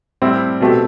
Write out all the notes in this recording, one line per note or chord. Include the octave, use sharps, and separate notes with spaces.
A2 G3 C4 E4
B2 A3 C4 G4